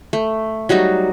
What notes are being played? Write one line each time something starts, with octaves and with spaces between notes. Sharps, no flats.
A3
F#3 G3 D#4 F#4